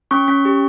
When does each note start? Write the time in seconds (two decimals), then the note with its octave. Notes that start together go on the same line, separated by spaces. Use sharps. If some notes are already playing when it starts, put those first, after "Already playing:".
0.11 C#4 C#6
0.28 C#4
0.45 G4